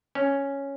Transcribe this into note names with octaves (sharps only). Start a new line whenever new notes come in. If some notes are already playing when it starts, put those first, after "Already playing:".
C#4